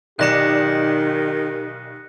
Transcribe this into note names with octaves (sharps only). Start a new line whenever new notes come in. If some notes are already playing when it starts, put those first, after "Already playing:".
B1 D#3 G4 D5 F#6 A#6 C#7 E7